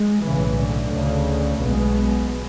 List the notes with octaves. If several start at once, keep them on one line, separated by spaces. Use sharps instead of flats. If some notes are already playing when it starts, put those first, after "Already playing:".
Already playing: G#3
B1 A2 C#3 E3
D3
D2 C#3
B1 B2 G#3 B3